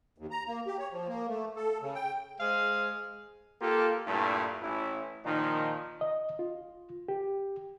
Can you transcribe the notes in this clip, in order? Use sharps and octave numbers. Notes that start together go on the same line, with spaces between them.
D#2
A#5
A#3
G4
C#5
F3
A#3
A3
A4
C#3
G5
G#3 G#4 C5 F5
A#3 F4 G4 A4
G2 A#2 A3 E4
A1 E4
A#2 D#3 F3 D#4
D#5
F4
G4